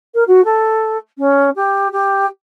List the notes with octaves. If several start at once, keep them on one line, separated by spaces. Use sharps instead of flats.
A#4
F#4
A4
C#4
G4
G4